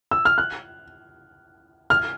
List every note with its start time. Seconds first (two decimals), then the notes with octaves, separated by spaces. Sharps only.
0.11 E6
0.25 F6
0.38 F#6
1.90 F6